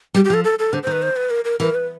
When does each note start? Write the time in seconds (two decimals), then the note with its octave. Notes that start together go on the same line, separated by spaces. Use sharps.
0.14 G3 G4
0.25 G4
0.30 F3 A4
0.44 A4
0.59 A4
0.73 D3 C5
0.83 C5
0.87 D#3 B4
1.02 C5
1.16 B4
1.30 A#4
1.45 A#4
1.60 E3 A#4
1.75 B4